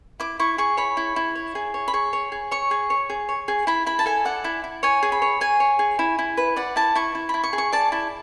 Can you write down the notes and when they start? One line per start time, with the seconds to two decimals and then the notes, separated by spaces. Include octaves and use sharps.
0.20 E4 D6
0.39 E4 C#6
0.58 G#4 C#6
0.77 C#5 B5
0.97 E4
1.16 E4
1.35 C#5
1.55 G#4
1.74 C#5
1.88 B5
1.93 G#4 C#6
2.13 C#5
2.32 G#4
2.51 C#5 C#6
2.71 G#4
2.90 C#5
3.10 G#4
3.29 C#5
3.48 G#4
3.67 E4 B5
3.86 E4 B5
3.99 A5
4.06 A4 G#5
4.25 D5 F#5
4.44 E4
4.64 E4
4.83 C#5 G#5
5.03 G#4
5.12 B5
5.22 C#5
5.41 G#4 G#5
5.60 C#5
5.79 G#4
5.99 E4
6.19 E4
6.37 B4
6.56 D5 F#5
6.76 E4 A5
6.95 E4 C#6
7.15 E4
7.29 E4 B5
7.44 C#6
7.53 G#4
7.58 C#6
7.72 D5 A5
7.92 E4 A5